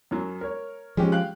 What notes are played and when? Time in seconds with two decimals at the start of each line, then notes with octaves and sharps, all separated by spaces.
0.11 F#2 F#3
0.41 A#4 C#5
0.97 F3 G#3 C#4 G4
1.12 F5 G5 F#6